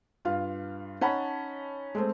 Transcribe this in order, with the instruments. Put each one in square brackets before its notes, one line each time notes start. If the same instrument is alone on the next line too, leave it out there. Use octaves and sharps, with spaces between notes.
[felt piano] G2 F4 F5
C#4 D#4 F#5 A5 B5
G#3 A3 C4